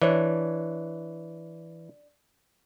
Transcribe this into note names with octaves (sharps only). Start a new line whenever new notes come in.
E3 D4 C#5